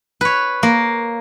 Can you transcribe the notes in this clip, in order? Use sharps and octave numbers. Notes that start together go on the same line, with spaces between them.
B4 C#5
A#3